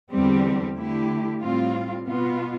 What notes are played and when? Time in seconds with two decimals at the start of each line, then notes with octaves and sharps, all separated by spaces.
0.12 E2 D3 G3 C4 G4
0.77 D3 A3 E4 G4
1.41 A2 G3 C4 F4
2.06 B2 B3 F4